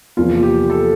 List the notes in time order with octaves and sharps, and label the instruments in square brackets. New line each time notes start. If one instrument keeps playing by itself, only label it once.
[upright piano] E2 C3 F3 A#3 [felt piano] F4
[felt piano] G4
A4